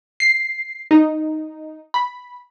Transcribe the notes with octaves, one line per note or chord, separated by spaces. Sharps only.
C7
D#4
B5